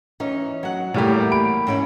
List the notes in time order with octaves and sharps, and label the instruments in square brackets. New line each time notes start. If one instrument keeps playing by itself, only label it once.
[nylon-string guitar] E3 C#4 D#4
F#3 F#5
[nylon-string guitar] E2 A#3 [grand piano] A2 G3 G4
[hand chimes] B5 [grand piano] D7
[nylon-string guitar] G#2 C#4 E4